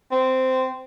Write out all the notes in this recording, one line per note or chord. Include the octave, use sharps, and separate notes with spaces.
C4